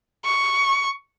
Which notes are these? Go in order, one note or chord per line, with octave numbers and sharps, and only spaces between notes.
C#6